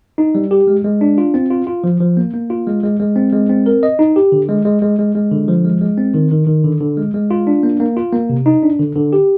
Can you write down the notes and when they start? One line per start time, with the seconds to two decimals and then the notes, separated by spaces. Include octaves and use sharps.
0.18 D#4
0.35 G3
0.51 G4
0.67 G#3
0.84 G#3
1.01 D4
1.18 F4
1.34 C4
1.50 F4
1.67 F4
1.84 F3
2.00 F3
2.17 A#3
2.34 A#3
2.50 F4
2.67 G#3
2.83 G#3
3.00 G#3
3.16 C4
3.33 G#3
3.49 C4
3.66 A#4
3.83 D#5
3.99 D#4
4.16 G4
4.32 D3
4.49 G#3
4.65 G#3
4.82 G#3
4.99 G#3
5.15 G#3
5.32 D3
5.48 F3
5.65 G#3
5.81 G#3
5.98 C4
6.14 D#3
6.31 D#3
6.47 D#3
6.64 D3
6.81 D3
6.97 G#3
7.14 G#3
7.31 F4
7.47 D4
7.63 A#3
7.80 A#3
7.97 F4
8.13 A#3
8.29 C3
8.46 D#4
8.63 D4
8.79 D3
8.95 D3
9.13 G4